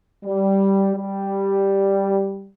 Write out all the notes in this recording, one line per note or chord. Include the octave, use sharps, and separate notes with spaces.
G3
G3